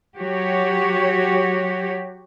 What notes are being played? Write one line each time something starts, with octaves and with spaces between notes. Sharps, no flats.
F#3 F#4 G4 C#5